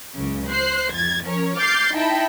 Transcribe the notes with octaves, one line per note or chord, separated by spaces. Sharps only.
C#2 F#2 C#3
C5 F#6 C7
F2 G#6 A6
F3 C#4 A#4 C#5
D6 F6 G6 A6 C7
D#4 E4 E5 G5 A5 B5